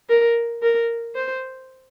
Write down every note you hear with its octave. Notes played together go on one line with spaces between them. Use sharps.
A#4
A#4
C5